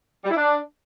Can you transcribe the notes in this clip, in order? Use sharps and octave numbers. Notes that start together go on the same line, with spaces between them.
G3
E4
D4